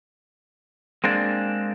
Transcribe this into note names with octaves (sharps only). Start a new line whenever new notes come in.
G#3 A#3 C4 D4